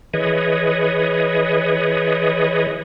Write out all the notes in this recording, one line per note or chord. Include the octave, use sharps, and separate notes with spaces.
E3 G#4 B4 C#5 D#5